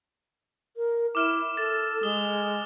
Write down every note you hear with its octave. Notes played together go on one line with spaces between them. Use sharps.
A#4
E4 D6 F6 E7
A4 A6
G#3 D#6 G7